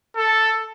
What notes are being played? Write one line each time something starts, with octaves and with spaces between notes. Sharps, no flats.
A4